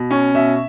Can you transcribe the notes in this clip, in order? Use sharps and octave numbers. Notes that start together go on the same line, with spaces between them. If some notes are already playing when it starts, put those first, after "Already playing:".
Already playing: B2
C#4
B2 E5